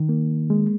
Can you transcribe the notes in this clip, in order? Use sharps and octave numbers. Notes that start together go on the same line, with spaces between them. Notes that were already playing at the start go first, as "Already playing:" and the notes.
Already playing: D#3
A#3
G#3